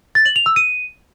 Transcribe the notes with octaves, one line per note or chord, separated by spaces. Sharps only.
A6
F#7
F7
E6
D#7